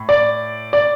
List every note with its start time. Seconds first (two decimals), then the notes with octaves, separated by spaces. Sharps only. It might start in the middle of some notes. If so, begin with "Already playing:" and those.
Already playing: A2
0.09 D5
0.73 D5